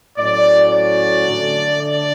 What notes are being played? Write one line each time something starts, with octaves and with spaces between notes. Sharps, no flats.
A2 F#3 C#4 D5
D5
D3 A3 D4
D5